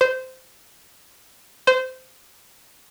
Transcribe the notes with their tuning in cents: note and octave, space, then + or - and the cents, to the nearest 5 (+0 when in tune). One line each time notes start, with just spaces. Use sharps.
C5 -15
C5 -20